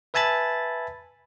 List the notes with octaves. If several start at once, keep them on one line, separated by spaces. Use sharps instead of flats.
B4 E5 G#5 A5 B5 A6